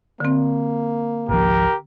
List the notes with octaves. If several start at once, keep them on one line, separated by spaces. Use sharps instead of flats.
D3 A#3 C4
G#1 C#2 F3 G4 A#4